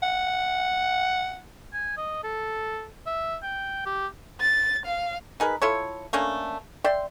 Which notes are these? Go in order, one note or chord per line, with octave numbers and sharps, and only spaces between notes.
F#5
G#5
D#5
A4
E5
G5
G4
A6
F5
D#4 G#4 A#4 B4
E4 F4 A4 C#5
A3 A#3 C#4 D4
D5 E5 G5 C6